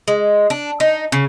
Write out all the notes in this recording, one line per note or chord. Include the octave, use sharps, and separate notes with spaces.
G#3
D4
D#4
C#3